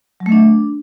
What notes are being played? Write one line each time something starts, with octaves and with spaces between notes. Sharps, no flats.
F#3
A3
D4